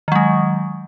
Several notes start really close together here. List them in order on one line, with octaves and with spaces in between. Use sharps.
D#3 F#3 G#3